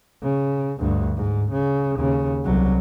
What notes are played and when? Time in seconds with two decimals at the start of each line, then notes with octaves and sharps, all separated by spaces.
0.23 C#3
0.79 D2 G2
1.17 G#2
1.52 C#3
1.95 D#2 C#3
2.44 C2 F#3